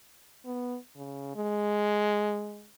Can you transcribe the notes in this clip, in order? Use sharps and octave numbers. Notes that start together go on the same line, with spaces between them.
B3
C#3
G#3